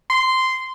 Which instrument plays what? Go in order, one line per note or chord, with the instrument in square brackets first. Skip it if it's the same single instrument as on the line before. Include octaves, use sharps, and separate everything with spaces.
[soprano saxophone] C6